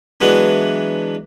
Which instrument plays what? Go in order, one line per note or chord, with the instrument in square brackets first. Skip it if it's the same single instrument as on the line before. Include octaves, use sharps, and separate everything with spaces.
[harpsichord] E3 F#3 G#3 B3 D4